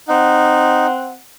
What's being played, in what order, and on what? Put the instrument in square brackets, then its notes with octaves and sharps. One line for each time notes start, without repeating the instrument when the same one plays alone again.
[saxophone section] C4 F#5 [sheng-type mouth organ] D#4